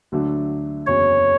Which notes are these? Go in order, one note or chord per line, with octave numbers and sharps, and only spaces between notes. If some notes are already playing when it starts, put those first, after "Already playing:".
D2 D3 F#3 A3 D4
F#1 E2 C#3 F#3 C#5